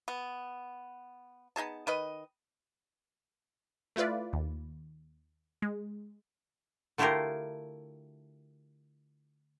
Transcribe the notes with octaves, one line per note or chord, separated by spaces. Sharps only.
B3
B3 D#4 G#4 A5
D#3 B4 D#5
A3 E4 F4 B4 D5
D#2
G#3
D3 A3 E4 F4 G4 A#4